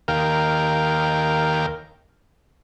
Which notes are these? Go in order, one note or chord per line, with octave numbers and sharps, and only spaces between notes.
D#2 A#4 F5 G5